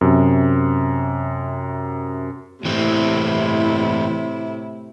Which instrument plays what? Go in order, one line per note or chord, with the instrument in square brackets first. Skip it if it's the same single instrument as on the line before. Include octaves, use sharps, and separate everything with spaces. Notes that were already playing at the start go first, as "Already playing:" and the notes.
[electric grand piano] F#2 C3
[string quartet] A2 C3 E4 [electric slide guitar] E3 C4